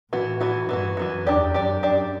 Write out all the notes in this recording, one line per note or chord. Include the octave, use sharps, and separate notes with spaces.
A2 E3 B3 F#4
E3 B3 F#4
G2 E3 B3 F#4
F#2 E3 B3 F#4
E2 D4 G4 D5
F#2 D4 G4 D5
D4 G4 D5